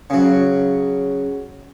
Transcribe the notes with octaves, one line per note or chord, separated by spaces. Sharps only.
C#3 F#3